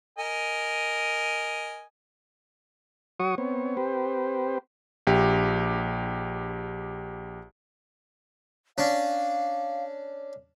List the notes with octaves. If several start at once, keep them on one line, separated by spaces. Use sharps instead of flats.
A#4 D#5 G#5
F#3 F#4 C#5 C#6 D#6
B3 C4 C#5
C4 G4 B4 C5
A#1 G4
C#4 D4 F5